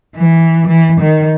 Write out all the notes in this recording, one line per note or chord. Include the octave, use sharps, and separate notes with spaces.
E3
E3
D#3